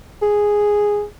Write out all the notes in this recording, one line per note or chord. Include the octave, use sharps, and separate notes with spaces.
G#4